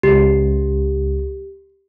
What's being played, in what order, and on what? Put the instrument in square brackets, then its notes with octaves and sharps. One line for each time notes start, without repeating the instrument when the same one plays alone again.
[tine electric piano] C#2 [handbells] G4